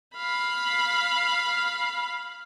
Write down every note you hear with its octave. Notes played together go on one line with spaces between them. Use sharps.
F5 B5